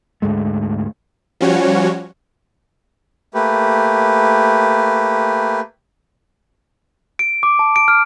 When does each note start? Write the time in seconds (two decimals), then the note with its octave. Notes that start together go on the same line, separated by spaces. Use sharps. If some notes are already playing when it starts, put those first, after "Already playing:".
0.22 D2 G#2 G#3 A3
1.41 F3 G3 C#4 F#4 C#5
3.34 A3 A#3 G4 B4
7.19 D7
7.43 D6
7.59 A5
7.76 D7
7.88 F6